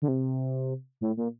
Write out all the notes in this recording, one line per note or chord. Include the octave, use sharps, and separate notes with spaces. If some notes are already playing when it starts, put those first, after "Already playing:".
D3
C3
A2
A#2